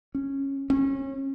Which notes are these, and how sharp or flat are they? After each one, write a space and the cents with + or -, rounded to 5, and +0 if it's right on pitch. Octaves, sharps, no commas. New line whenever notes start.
C#4 -10
C#4 -30